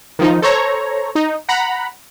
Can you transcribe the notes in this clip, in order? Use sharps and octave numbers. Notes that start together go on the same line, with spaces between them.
D#3 F3 D#4
A4 C5 C#5 A#5
D#4
F#5 A#5 B5